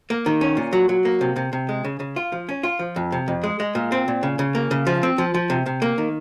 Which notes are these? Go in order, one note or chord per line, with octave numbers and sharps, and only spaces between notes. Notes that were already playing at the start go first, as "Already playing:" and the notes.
A#3
D#3
C#4
A#2
F#3
F#3
A#3
C3
C3
C3
G#3
C#3
C#3
F4
F3
C#4
F4
F3
F2
C3
F2
G#3
G#3
A#2
C4
A#2
C#3
C#3
A#3
C#3
F3
C4
F3
F3
C3
C3
A#3
D#3